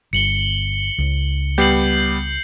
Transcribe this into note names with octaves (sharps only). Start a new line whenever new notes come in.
G1 C#7 F#7 G7
C#2
G3 B3 G4 G6 C7 F#7